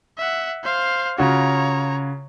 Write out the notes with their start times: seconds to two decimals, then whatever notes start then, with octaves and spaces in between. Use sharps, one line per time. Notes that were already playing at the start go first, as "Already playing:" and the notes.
0.18 E5 F#5
0.64 C5 F5
1.18 C#3 F4 F#4 C#5 A#5